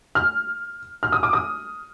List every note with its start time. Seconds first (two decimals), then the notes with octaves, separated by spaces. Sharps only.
0.15 F6
1.03 F6
1.12 D#6
1.23 D6
1.33 D#6